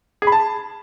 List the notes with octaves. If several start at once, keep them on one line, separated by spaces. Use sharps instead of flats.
G#4
B5
A5